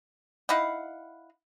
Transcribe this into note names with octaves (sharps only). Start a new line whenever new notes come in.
D#4 E4 F5 F#5